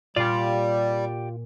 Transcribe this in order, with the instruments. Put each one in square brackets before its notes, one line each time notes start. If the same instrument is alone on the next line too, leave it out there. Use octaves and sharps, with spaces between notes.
[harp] A#2 [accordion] G3 [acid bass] F4 [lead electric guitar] G4 D5